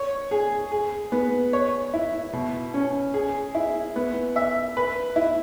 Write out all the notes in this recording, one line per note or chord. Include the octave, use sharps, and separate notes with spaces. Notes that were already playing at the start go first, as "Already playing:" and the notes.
Already playing: C#5
G#4
G#4
B3
C#5
E4
B2
C#4
G#4
E4
B3
E5
B4
E4